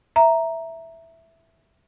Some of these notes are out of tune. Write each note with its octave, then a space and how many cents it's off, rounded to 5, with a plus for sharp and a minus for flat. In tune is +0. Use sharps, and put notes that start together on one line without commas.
E5 +0 A#5 +0